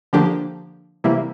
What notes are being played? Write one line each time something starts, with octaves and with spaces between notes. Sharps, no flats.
D3 F3 A#3 D4 G4
C3 E3 G3 A#3 E4